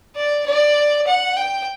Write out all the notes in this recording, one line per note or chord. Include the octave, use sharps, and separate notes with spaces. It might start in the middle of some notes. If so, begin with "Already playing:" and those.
D5
D5
F#5
G5